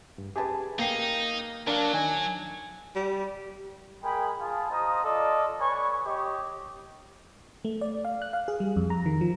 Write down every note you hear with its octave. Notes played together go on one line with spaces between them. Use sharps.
G2
G4 G#4 B4 G#5 A5
A#3 D#4 F5 G5 C7
F#3 D4 A#4 F5 A5
D#3 G#5
G3
G#3 G#4 A#4 G5 B5
F4 G#4 F5 A5
F4 C5 D#5 A#5 D#6
F4 A4 D5 D#5
B4 C#5 D5 G#5 C#6
G4 C#5 D#5
A3
D5
F5
F#6
F5
G#4
G3
F2
A#5
D#3
F3